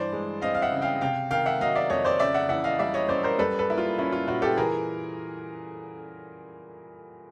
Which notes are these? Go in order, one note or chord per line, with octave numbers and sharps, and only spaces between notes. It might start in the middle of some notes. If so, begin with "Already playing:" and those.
Already playing: G2 E3 C5 D5
G#3
C4 D#5 F5
F5
E5 F#5
C#3
F5 G5
C3 F5 G5
D#3 F5 G5
E5 F#5
F#3 D#5 F5
D5 E5
F2 C#5 D#5
C5 D5
C#3 D5 E5
E5 F#5
E3 E5 F#5
D#5 F5
G3 D5 E5
C#5 D#5
F#2 C5 D5
A#4 C5
G3 A4 B4
A4 B4
A#3 E4
F4
C#4 E4
F4
A#2 E4 F#4
G4 A4
E3 G#4 A#4